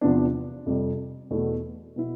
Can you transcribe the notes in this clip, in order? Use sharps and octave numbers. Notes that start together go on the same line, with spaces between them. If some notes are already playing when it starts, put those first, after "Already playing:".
E2 C3 F3 B3 D4
F2 C3 G3
E2 B2 A3 E4
B2 B3 E4